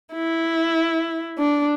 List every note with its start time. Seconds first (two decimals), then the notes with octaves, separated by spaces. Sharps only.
0.14 E4
1.38 D4